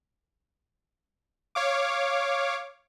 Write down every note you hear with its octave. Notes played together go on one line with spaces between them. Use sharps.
C#5 F5 D6